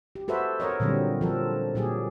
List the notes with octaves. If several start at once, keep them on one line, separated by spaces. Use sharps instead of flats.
G4
F#4 A4 B4 C5 E5
A4 A#4 C#5 D#5
A#2 D3 F#3 G3 C4
F3 A4 A#4
A#2 F#3 G4 G#4